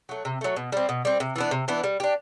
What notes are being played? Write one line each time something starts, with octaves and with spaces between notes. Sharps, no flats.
F#3 A3
C3
F#3 A3
B2
G3 C4
B2
G3 C4
C3
E3 B3 D4
C3
E3 B3 D4
G3
D4 G4